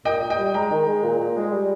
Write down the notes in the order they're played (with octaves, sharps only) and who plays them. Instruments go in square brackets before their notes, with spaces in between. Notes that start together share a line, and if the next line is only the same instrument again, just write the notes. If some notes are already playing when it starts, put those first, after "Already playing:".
[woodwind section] A#2 [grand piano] D#5 G5
[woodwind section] A#2
[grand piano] D#5 G5
[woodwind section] G3
[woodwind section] G#3 [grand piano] G5 A#5
[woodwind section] D#3
G#3
A#2
A#2
G#3
G3